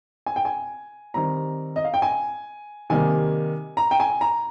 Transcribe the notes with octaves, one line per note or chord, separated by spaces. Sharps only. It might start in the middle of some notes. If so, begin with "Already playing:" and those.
G#5
G5
G#5
D#3 G3 C4 A#5
D#5
F5
G5
G#5
C3 D#3 G3 A#3 G#5
A#5
G5
G#5
A#5